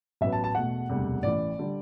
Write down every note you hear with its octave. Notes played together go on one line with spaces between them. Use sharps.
A1 A2 F#3 B3 E5
A5
A5
E1 E2 B2 A3 F#5
E1 D2 C3 G3
A1 A2 E3 D5
D3 G3